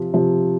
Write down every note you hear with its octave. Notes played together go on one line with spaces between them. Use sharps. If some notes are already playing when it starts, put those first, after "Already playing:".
Already playing: C3 F3
C3 F3